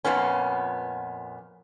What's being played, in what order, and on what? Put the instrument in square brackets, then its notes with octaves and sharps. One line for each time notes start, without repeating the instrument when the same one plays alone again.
[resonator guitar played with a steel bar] F2 A#2 B3 C#4